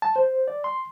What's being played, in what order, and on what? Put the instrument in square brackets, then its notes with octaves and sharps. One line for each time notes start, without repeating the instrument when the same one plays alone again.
[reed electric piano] A5
C5
D5
C6